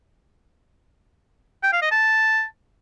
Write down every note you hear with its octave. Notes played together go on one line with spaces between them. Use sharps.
G5
F5
D#5
A5